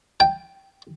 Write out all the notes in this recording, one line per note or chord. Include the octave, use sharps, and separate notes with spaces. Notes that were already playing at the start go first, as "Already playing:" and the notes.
G5